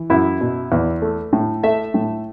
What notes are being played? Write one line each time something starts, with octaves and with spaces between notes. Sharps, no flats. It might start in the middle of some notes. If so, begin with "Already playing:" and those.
Already playing: E3
F#2 E4
B2
E2
A3
A2
A3 E5
A2